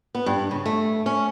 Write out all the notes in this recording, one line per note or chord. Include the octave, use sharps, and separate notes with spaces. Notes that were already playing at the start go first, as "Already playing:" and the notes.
B3
G2
C#3
A3
C#4